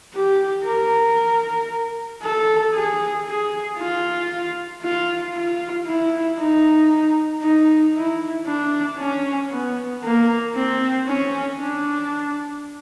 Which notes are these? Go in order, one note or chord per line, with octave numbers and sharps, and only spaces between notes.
G4
A#4
A4
G#4
G#4
F4
F4
F4
E4
D#4
D#4
E4
D4
C#4
B3
A#3
C4
C#4
D4